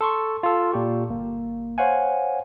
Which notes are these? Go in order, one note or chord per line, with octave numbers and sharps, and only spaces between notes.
A4 C6 C#6
F4 A4
A#2 G4 C#6
G1 A#3
C5 C#5 F5 F#5 G#5